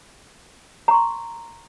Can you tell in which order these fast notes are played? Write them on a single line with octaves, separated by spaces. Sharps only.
A#5 C#6 C6